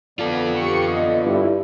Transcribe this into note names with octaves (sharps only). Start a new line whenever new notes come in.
D3 B3 F4 A4 D5
G4 C#6 C#7
D#5
G2 E4